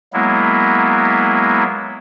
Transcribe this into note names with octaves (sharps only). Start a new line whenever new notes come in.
F#3 G#3 A#3 B3 E4